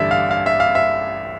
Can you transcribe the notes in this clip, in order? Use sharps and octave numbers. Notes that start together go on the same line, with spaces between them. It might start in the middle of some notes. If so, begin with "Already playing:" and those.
Already playing: A1 G2 D3 D5 E5
F5
F5
E5
F5
E5